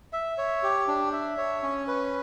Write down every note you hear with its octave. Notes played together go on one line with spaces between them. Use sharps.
E5
C#5
G4
D4
E5
C#5
C#4
B4